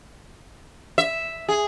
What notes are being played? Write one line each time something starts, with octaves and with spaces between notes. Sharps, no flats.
E5
G#4